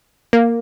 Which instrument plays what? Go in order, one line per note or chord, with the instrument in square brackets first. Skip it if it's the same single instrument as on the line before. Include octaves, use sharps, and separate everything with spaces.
[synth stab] A#3